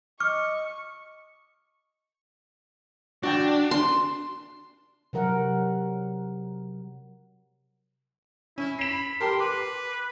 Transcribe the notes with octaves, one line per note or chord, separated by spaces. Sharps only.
D#5 C#6 D6 F6
D4 F#4 D5 G5
C6
C3 F#3 A#4 F#5
C#4 E4
B5 C7 E7
G4 A4 A#4 C6
B4 D6